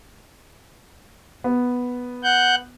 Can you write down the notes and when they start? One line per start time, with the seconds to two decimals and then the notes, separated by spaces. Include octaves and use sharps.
1.44 B3
2.24 F#5 F#6 G6